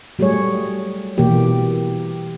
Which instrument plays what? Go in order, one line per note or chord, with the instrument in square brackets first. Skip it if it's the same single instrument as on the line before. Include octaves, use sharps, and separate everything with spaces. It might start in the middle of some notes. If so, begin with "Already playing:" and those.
[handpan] F#3 G3 A3 G#4 C#5
B2 E3 A#3 G4